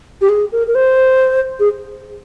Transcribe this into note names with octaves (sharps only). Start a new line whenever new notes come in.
G4
G#4
A#4
A#4
C5
G#4